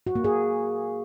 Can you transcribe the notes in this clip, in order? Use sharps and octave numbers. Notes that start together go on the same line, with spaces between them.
F#4
A#3
G#4